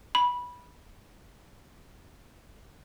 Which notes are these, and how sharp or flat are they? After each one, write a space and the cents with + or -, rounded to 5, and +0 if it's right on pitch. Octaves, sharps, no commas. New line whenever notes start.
B5 -15